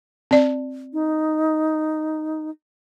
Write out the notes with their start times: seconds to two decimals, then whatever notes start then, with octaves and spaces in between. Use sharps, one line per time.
0.31 C4 D5
0.93 D#4